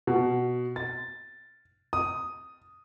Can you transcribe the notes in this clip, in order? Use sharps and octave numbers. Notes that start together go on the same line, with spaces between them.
B2
A6
D#6